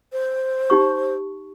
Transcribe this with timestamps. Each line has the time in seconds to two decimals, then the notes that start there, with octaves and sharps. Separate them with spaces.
0.12 C5
0.70 D#4 G4 C#6